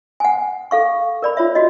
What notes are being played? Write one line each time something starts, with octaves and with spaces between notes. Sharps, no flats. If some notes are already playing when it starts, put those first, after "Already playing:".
F#5 G#5
A4 F5 C#6
A#4 D5 B5
F4 C#5 E5
F#4 D#5